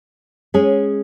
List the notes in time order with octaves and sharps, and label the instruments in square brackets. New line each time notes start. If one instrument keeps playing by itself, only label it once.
[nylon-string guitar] G#3 C#4 G#4